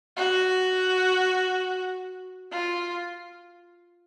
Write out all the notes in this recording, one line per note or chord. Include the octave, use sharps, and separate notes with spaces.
F#4
F4